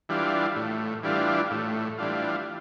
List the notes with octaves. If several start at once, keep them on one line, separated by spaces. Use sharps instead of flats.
E3 G3 D4 F4
A2
E3 G3 D4 F4
A2
E3 G3 D4 F4